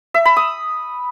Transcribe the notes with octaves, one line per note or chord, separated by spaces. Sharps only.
E5
B5
D#6